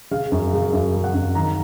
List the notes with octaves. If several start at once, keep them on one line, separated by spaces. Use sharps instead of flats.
C#3 F5
F#2
C#3
F#2
C#3
F#5
F#2
D#3 A#5